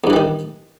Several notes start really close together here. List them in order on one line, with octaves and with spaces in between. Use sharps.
E2 G2 E3 G3 D#3